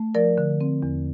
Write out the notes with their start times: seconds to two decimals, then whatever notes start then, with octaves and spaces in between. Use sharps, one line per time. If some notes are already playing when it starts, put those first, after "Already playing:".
Already playing: A3
0.15 F3 A#4 D5
0.38 D3
0.61 C4
0.83 E2